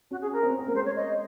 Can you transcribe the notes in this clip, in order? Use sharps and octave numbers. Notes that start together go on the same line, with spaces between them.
C#4 F#4
G#4
A#4
C4
C#4
C4
A#3 A#4
G#3 C5
C#5
D#5